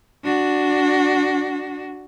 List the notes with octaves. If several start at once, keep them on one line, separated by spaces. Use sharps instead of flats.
D4 F#4